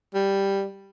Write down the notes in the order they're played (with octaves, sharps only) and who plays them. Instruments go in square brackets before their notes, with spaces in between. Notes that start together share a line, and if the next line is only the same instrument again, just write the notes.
[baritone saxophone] G3